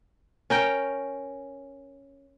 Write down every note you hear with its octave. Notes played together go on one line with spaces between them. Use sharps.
C#4 A#4 G5